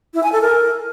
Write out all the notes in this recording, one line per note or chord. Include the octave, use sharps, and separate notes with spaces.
E4
G#5
A4
A#4